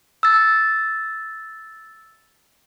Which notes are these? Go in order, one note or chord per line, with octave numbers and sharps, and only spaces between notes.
E6 A6